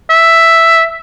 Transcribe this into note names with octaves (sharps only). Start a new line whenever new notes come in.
E5